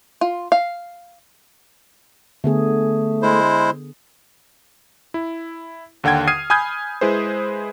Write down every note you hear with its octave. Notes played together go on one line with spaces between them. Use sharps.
F4
F5
D3 A3 B3 G#4
G#3 E4 C5
E4
D#2 D3 F#5 G5 G#6
D#6 F6 G#6 C7 D#7
G#5 B5 D#6 F6 G6 G#6
G#3 E4 G#4 B4 C5